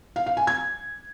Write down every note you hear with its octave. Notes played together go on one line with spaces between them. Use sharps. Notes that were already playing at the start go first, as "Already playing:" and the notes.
F5
F5
G#5
G#6